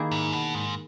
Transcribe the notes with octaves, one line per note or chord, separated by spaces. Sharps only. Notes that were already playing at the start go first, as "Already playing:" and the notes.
Already playing: D#3 A#3 E4 G#4
G#2
B2
G#2